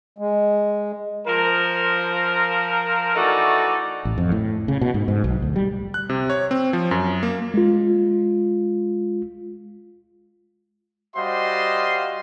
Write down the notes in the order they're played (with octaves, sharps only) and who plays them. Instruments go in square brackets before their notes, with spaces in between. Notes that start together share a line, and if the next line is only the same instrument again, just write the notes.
[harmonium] G#3
[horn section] F3 A#4
E3 A3 D#4 F#4 A4 D5
[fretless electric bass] A1
F2
A2
C#3
B2
G#2
G#2
B1
D2
G3
[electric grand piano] F#6
C3
C#5
C4
F3
F#2
A#3
[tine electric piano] G#3 F4
[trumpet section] G3 F#4 C5 D#5 F5 C6